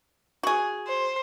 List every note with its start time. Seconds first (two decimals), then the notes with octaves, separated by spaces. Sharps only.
0.43 F#4 G#4
0.88 C5